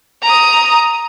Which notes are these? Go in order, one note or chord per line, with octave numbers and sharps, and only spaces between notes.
A#5 D#6